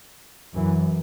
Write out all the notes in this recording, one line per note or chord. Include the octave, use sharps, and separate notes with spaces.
F#2 E3